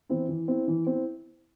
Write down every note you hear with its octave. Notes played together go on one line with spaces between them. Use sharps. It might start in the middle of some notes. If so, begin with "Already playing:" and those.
E3 C4 E4
E3
C4 E4
E3
C4 E4